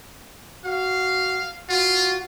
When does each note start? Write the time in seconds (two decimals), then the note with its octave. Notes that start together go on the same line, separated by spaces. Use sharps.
0.65 F#4 F5
1.69 F4 F#4